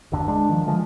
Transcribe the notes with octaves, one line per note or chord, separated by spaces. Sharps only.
F#1 D#2 D3
G#3 D4
D#3 F3
D3 E3 F3 G#3